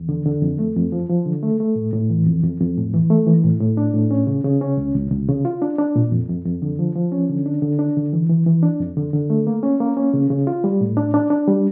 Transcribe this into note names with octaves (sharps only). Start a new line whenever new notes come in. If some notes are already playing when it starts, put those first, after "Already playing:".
Already playing: E2
D3
D3
F2
A3
F2
F3
F3
D3
A3
A3
A2
A2
E3
F2
F2
F2
A2
E3
A3
E3
A2
A2
D4
A2
C#4
C#3
C#3
C#4
C#2
C#2
C#2
C#3
F4
D4
D4
A#2
F2
F2
F2
D3
F3
F3
C#4
D3
D4
D3
D4
D3
E3
E3
E3
D4
F2
D3
D3
A3
A#3
C#4
A#3
C#4
C#3
C#3
F4
G3
A2
D4
D4
D4
G3